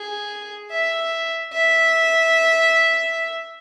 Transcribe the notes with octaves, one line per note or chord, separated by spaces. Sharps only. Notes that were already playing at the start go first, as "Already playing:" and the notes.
Already playing: G#4
E5
E5